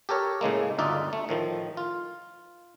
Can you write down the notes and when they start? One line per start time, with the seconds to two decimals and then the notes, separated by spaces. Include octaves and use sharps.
0.09 G4 A4 A#4 C#5
0.41 A2 C#3 G#3 A#3
0.79 G1 D2 D#4 F4 D5 E5
1.13 A3
1.29 A2 D#3 F3
1.77 F4